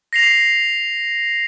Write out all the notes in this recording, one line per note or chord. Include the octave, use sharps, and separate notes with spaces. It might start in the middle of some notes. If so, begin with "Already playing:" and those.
A#6 C7 F7